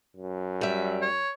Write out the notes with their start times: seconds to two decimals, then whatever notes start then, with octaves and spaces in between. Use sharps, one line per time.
0.16 F#2
0.61 G3 E5
1.02 C#5